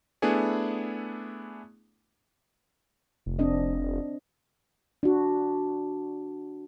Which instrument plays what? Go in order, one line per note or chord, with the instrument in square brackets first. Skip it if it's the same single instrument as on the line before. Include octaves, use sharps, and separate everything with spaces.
[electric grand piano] A3 B3 D4 E4 G#4
[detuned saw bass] F1
[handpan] C4 D4 D#5
D4 F#4